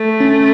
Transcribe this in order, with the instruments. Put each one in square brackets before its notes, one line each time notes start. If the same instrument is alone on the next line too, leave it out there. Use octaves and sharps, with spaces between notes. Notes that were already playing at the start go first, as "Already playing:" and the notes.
Already playing: [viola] A3
[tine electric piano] C#4